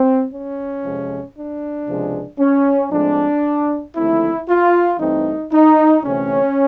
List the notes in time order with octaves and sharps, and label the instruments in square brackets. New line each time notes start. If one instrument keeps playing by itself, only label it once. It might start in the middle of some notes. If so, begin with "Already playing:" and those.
Already playing: [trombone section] C4
C#4
F2 C3 F3 G#3
D4
C#2 C3 F3 G#3
C#4
A2 F3 G#3 C4 D4
D#2 D3 F3 A3 C4 E4
F4
G2 E3 A3 C4 D#4
D#4
D2 C3 E3 A3 C4 C#4